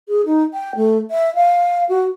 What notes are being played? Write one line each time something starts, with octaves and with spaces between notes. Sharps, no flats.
G#4
D#4
G5
A3
E5
F5
F#4